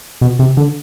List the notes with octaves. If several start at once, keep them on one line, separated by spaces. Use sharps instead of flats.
B2
C3
D3